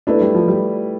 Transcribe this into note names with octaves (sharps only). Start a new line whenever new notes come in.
A3 D4 E4 B4
G3
F3
G3